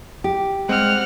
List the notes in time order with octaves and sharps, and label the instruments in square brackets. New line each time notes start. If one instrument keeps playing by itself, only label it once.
[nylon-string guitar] G4
[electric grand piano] G3 C4 [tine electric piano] G#3 [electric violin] F#5 F6